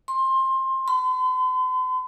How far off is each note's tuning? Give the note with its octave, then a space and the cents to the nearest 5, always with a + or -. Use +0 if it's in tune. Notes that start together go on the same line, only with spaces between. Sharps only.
C6 +20
C6 -45